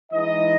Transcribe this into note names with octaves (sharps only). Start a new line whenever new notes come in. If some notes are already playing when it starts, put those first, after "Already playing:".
E3 G#3 D#4 D#5